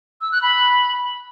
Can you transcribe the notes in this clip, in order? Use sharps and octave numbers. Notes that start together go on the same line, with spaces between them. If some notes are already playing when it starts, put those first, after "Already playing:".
E6
F#6
B5